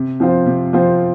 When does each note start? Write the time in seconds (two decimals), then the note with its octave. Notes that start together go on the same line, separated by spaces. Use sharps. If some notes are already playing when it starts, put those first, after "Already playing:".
Already playing: C3
0.20 F3 C4 F4 C5
0.46 C3
0.73 F3 C4 F4 C5